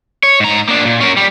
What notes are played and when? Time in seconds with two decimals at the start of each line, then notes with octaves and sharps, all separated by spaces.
0.23 C#5
0.40 G#2 A#5
0.68 A#3 D4
0.86 A#2
1.01 C#4 A#4
1.17 G3